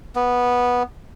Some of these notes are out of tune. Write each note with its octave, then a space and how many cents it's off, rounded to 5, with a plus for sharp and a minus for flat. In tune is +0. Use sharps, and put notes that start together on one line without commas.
B3 -10